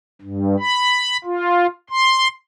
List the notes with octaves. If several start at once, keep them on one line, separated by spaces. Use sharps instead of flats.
G2
B5
F4
C6